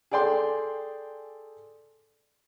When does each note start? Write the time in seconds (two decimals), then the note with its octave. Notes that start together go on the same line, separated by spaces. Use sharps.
0.11 G#4 A4 D5 G5 C6